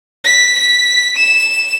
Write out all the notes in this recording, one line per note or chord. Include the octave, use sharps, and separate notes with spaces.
B6
B6
E7